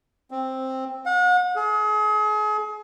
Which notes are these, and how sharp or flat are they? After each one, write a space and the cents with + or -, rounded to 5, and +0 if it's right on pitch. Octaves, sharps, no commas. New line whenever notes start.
C4 +5
F#5 -40
G#4 +35